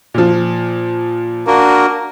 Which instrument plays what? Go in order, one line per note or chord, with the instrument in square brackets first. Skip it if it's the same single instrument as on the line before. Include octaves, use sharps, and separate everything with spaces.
[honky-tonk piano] A#2 F3
[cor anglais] A#3 [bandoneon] D4 F#4 A#4